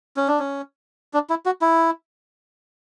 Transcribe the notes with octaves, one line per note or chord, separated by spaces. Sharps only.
C#4
D4
C#4
D4
E4
F#4
E4